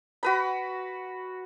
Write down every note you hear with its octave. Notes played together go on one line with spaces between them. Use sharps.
F#4 B4 B5